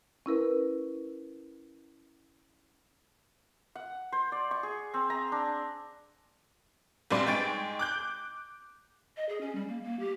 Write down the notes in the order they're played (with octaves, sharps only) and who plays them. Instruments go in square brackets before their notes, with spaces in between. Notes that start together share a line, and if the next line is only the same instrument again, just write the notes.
[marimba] C#4 E4 A#4 B4
[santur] F#5
C5
D5
C#6
G#4
C4
A#5
D4
[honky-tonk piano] A#1 G2 G3 C4 D5 C6
G#2 G#3 G5 C#6 A6 D7
D6 F#6 G6
[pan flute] D#5
G#4
C#4
G3
A#3
A#3
G4